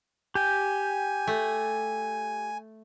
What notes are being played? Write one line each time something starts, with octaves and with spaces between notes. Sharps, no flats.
G4 G5 G#5
A3